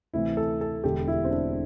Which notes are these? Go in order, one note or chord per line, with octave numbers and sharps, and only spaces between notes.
D2 C3 E3 E4
A4
A4
E1 E2 D3 G4
E4
C4
D4